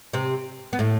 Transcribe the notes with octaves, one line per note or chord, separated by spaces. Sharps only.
C3 C4
B3
A2 A3